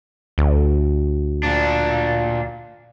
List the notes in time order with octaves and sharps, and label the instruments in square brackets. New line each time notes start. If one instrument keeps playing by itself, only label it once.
[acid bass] D2
[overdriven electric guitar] A#2 D4